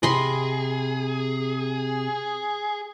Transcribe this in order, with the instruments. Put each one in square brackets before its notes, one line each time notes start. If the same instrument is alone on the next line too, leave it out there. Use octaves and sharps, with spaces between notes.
[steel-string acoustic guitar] C3 [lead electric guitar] G#4 [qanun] D#5 B5 C6